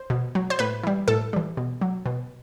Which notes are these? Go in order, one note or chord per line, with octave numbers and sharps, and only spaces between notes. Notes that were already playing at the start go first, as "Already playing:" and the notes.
Already playing: C5
B2
F#3
C5
A2 B4
E3 G3
A2 A4
E3 G3
B2
F#3
B2